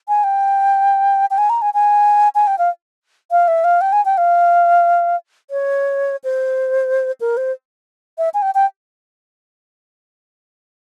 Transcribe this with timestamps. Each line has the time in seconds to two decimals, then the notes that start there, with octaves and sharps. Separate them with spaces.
0.08 G#5
0.24 G5
1.31 G5
1.38 G#5
1.50 A#5
1.62 G#5
1.74 G#5
2.35 G#5
2.47 G5
2.58 F5
3.31 F5
3.48 E5
3.64 F5
3.81 G5
3.92 G#5
4.05 G5
4.18 F5
5.50 C#5
6.24 C5
7.21 A#4
7.37 C5
8.18 E5
8.34 G#5
8.42 G5
8.55 G5